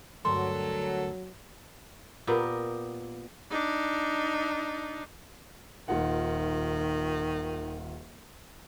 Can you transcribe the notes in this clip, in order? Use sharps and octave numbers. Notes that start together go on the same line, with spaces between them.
D2 G2 F#3 A4 A#4 C6
A#2 B3 G4 A#4
D4 D#4
D#1 D#3 F4 F#5